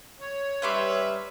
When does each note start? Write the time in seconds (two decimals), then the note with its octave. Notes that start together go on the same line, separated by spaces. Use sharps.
0.20 C#5
0.62 G3 C#4 B4 E5 C6 D6